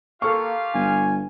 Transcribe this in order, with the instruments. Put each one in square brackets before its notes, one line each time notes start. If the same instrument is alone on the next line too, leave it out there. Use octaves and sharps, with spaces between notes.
[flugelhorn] A#3 [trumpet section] F4 G4 F5 [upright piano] A4 C#6
[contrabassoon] G1 [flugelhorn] G#5